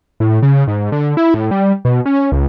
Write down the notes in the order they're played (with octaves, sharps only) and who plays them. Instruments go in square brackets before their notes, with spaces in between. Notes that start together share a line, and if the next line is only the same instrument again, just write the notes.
[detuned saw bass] A2
C#3
G#2
D3
E4
A2
G3
B2
C#4
C#2